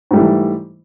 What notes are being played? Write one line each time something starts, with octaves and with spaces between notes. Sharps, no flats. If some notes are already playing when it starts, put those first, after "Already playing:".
G#2 E3 G3 A3